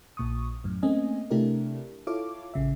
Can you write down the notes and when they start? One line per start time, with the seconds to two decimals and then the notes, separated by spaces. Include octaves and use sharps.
0.17 A#1 A#2 C#6 D#6
0.64 F#2 A2
0.83 A3 A#3 C4 C#4 D#5 G#5
1.30 C3 A3 D4 E4 G4 A#4
2.07 E4 F4 A4 C#5 F5 D6
2.54 A1 C#3 E5